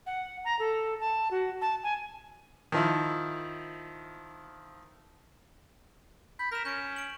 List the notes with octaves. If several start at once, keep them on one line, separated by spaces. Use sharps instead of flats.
F#5
A#5
A4
A5
F#4
A5
G#5
D#3 F3 E4
B5 G6
A#4 B6 E7
C#4 G6 D7
D7 F#7